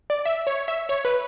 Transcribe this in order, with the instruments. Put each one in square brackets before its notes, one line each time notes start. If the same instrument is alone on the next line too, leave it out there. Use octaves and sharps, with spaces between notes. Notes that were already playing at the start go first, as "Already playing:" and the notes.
[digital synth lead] D5
E5
C#5
E5
C#5
B4